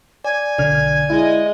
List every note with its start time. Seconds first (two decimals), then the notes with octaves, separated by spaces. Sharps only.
0.24 D5 G#5
0.58 B1 D3 D5 F6
1.10 G#3 E4 D#5